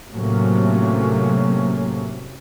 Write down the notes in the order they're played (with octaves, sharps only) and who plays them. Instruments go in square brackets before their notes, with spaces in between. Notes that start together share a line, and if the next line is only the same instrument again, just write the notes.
[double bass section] A2 C3 F#3 A3 A#3 C#4